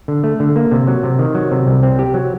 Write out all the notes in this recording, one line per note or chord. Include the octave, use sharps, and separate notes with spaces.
D3
A3
D3
A#3
C3
F#3
C3
D#3
F#3
C3
C2
C4
G4
F#3